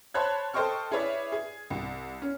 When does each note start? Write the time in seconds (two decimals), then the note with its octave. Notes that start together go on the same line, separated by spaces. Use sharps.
0.14 C5 C#5 A5 B5 F#6 G#6
0.54 A4 C5 D#5 G5 C#6 F6
0.91 E4 G#4 B4 C#5 D5 E5
1.32 G#4
1.70 C2
2.22 C#4